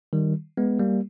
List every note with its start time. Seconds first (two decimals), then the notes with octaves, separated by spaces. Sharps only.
0.13 D#3 G3
0.57 G#3 B3
0.80 G3 A#3